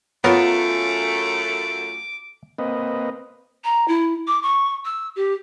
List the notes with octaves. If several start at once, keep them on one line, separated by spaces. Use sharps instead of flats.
F#2 A3 B3 F4 A#4 C#5 D6
A#3 C4 B4 D#5
A#5
E4
D6
C#6
E6
G4